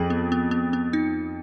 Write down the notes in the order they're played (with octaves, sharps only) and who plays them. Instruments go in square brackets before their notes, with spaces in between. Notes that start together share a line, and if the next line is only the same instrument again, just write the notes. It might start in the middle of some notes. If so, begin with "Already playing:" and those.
Already playing: [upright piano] F2 [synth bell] G#4
[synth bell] B3
B3
B3
B3
D#4